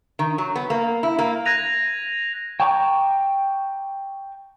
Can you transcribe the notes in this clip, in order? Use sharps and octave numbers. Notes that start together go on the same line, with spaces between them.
D#3
F#3
B3
A#3
E4
A#3
F#6 G#6 A#6 D#7 F7
G5 A5 A#5 C#6 D6